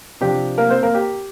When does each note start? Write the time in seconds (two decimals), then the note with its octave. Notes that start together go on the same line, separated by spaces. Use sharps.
0.21 C3 F3 D4 G4
0.58 A#3 A#4
0.70 C4 C5
0.83 A#3 A#4
0.95 G4